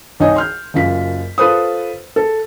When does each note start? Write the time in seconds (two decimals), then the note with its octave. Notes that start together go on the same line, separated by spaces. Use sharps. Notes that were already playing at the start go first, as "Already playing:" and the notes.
0.20 C2 D#4 C#5 D#5 G#5
0.36 C6 F6 G6
0.74 F#1 F#2 F4 B6
1.38 F4 A4 B4 C5 D#6
2.16 A4